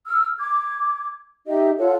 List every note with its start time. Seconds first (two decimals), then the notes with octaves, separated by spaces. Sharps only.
0.07 E6 F6
0.38 D6 G#6
1.47 D#4 G4 D#5 E5
1.78 F4 A4 C#5 F#5